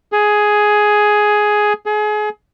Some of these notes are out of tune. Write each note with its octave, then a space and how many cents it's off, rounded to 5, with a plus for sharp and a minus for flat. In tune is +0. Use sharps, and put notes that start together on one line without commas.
G#4 +10
G#4 +30